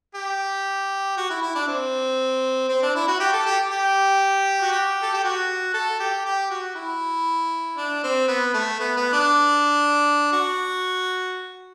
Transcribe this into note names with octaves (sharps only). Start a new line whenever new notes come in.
G4
F#4
E4
E4
D4
C4
C4
D4
E4
F#4
G4
A4
G4
G4
F#4
G4
A4
G4
F#4
A4
G4
G4
F#4
E4
D4
C4
B3
A3
B3
B3
D4
F#4